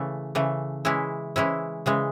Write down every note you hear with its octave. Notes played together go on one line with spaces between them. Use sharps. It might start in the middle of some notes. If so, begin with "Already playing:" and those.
Already playing: C#3 E3 A3
C#3 E3 A3
E3 G#3 C#4 E4
E3 G#3 C#4 E4
C#3 E3 G#3